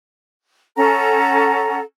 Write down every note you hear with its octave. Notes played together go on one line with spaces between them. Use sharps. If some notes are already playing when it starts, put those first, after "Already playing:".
C#4 A4 F#5 A#5